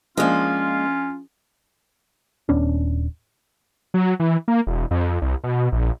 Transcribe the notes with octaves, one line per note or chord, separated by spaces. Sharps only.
F3 G#3 A#3 C#4 D4 F4 G#4
D#1 B3 C#4 D4
F#3
E3
A#3
E1
F2
C2
B2
A#1